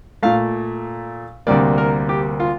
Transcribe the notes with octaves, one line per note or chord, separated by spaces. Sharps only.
A#2 A3 F5
D2 C3 G3 A#3 D5
A#4
G4
F4